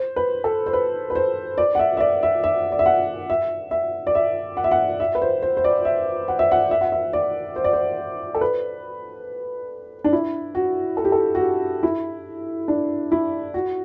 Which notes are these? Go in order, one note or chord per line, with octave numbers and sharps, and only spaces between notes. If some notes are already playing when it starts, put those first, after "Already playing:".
Already playing: C5
B4
A4
C5
B4
B4
C5
D5
F#5
E5
E5
D5
E5
E5
D5
E5
F#5
E5
E5
D5
E5
F#5
E5
F#5
E5
B4
C5
C5
C5
D5
E5
F#5
E5
F#5
E5
F#5
E5
D5
C5
D5
C5
A4
B4
D4
E4
F#4
A4
G4
A4
F#4
G4
E4
D4
E4
F#4